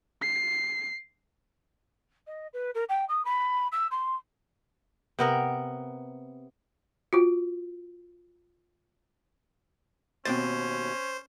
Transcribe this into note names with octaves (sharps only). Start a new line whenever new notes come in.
C7
D#5
B4
A#4
G5
D#6
B5
E6
C6
C3 B3 A#4
F4 F#4
D#2 B2 C4 C#4 C5 A6